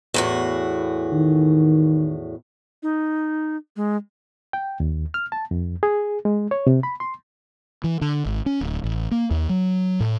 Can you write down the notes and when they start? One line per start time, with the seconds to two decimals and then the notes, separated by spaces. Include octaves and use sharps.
0.14 E2 A2 F#4
1.12 D#3
2.83 D#4
3.76 G#3
4.53 G5
4.80 D#2
5.14 F6
5.32 A5
5.51 F2
5.83 G#4
6.25 G#3
6.51 C#5
6.67 C3
6.83 B5
7.00 C6
7.84 E3
8.02 D3
8.26 G#1
8.46 C#4
8.61 D1
8.84 A1
9.11 A#3
9.31 D#2
9.49 F#3
10.00 A2